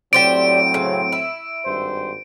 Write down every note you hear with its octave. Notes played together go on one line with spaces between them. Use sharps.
A2 F#3 C4 G4 C5 D5 D7
C#3
E4
G#1 G2 C5